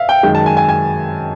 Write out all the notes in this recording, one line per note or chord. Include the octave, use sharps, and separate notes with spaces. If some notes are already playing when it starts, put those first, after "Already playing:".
Already playing: E5 F5
G5
F#2 D#3 G#3 G5
A5
G#5
G#5
G#5